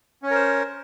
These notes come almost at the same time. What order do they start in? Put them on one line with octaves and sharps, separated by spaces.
C#4 C#5 A#4 C5